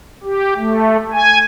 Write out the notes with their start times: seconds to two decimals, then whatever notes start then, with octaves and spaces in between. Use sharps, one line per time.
0.23 G4
0.57 A3
1.13 G#5